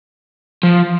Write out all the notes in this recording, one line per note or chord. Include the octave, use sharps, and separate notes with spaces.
F3